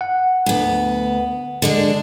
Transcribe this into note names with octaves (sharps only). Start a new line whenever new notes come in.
F#5
D2 B3
D3 G#3 D4